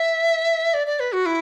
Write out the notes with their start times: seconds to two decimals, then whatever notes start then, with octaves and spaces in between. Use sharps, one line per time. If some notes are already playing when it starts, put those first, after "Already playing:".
Already playing: E5
0.74 D5
0.87 D5
1.00 B4
1.13 F#4
1.26 E4